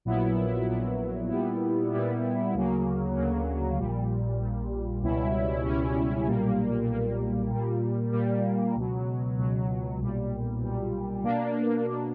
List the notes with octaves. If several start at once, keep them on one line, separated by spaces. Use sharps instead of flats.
A#1 A#2 F#3 B3 E4
A#1 A#2 F#3 B3 E4
A#2 G3 B3 E4
A#2 G3 B3 E4
D2 C#3 F#3 A#3
D2 C#3 F#3 A#3
A#1 A#2 G3
A#1 A#2 G3
C#2 B2 G3 C#4 E4
C#2 B2 G3 C#4 E4
B1 A#2 G3 A#3
B1 A#2 G3 A#3
A#2 G3 A#3
A#2 G3 A#3
C#2 B2 F#3
C#2 B2 F#3
B1 A#2 G3
B1 A#2 G3
B2 A#3 D4
B2 A#3 D4